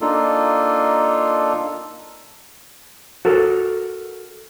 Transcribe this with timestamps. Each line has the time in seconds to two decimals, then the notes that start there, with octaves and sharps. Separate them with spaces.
0.01 A#3 D4 D#4 F4 A4
3.25 F#4 A4 A#4